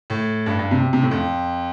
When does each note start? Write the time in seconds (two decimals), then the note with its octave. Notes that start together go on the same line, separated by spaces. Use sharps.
0.10 A2
0.46 G2
0.59 G2
0.71 C3
0.93 C3
1.02 A2
1.11 F2